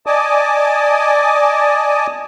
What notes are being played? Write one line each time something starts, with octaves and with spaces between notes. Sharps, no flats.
D5 D#5 G#5 A5 D6 D#6